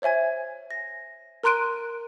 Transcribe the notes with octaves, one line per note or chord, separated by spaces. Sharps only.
C5 C#5 E5 G#5 G#6
A#6
A#4 A#5 C6 F#6 D7 D#7